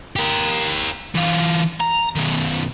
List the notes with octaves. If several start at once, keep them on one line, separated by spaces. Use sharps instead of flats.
G4 A#4
E3 F4
A#5
B2 D#3